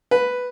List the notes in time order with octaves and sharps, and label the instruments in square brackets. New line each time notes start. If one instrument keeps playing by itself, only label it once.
[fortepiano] B4